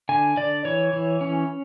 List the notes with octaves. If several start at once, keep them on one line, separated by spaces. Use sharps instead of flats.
D3 G#5
D3 D5
E3 C#5
E3
C#4